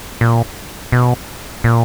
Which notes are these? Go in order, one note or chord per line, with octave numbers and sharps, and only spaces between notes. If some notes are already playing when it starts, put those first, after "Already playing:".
A#2
B2
A#2